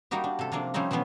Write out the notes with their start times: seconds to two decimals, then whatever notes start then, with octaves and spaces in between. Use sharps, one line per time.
0.11 G3 A#3 D#4 F#4 G4
0.24 D4
0.39 C3 A4
0.52 C3 F3 A#3 D4
0.74 F3 G3 A3 C4 C#4 D#4
0.91 B2 E3 F3 B3 C#4